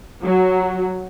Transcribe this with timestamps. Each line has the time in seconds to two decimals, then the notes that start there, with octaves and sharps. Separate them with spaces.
0.24 F#3